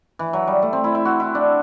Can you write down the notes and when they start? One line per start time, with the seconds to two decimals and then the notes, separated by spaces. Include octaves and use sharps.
0.19 E3
0.33 F#3
0.47 G3
0.62 A3
0.73 C4
0.84 E4
0.95 E4
1.05 F#4
1.20 E4
1.35 D4